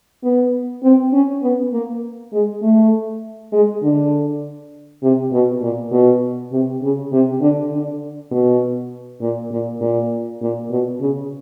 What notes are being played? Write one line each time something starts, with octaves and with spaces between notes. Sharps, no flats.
B3
C4
C#4
B3
A#3
G#3
A3
G#3
D3
C3
B2
A#2
B2
C3
C#3
C3
D3
D3
B2
A#2
A#2
A#2
A#2
B2
C#3